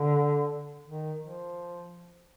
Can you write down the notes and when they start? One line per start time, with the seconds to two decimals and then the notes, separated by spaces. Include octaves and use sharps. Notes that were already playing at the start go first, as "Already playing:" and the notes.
Already playing: D3
0.88 D#3
1.21 F3